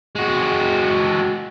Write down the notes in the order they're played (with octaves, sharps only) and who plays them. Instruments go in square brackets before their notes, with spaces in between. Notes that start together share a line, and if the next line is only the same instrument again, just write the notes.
[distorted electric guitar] G#3 F#4